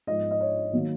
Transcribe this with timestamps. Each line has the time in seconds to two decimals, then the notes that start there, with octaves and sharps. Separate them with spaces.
0.07 G#2 F3 G#3 B3 D#5
0.31 D#5
0.40 C#5
0.73 D#3 F#3 A#3